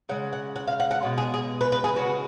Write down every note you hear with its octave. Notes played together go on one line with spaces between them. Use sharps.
C#3 G#3 F#5
F#5
F#5
F5
F#5
F#5
B2 G#3
G#4
G#4
B4
B4
G#4
C#3 G#3 F#4